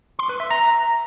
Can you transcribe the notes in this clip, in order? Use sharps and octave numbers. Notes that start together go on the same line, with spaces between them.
C6
B4
E5
A#5